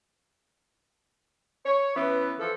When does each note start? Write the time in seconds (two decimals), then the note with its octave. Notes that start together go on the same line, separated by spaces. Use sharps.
1.65 C#5
1.95 E3 B3 C#4 E4
2.39 E3 F3 A4